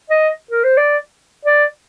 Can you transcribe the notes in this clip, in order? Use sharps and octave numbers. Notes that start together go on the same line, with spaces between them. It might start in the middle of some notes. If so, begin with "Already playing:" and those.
D#5
A#4
C5
D5
D5